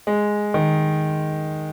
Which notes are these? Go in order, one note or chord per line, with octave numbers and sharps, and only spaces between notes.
G#3
D#3